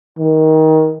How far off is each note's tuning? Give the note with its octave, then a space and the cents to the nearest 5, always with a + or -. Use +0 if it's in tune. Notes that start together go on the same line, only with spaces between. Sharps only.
D#3 +20